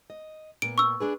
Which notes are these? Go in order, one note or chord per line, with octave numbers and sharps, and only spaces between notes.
D#5
A#2 B3 D7
C#6 E6
D4 G#4 B4